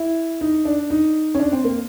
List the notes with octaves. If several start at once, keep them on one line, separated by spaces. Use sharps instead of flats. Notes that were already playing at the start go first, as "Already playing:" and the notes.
Already playing: E4
D#4
D4
D#4
C#4
D4
C4
A#3